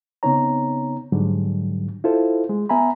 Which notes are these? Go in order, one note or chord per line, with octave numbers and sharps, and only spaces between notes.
C#3 B3 C4 D#4 C#5 A#5
G#2 D3 F#3 G3
E4 F4 A4 C5
G#3
B3 E5 G#5 A#5 B5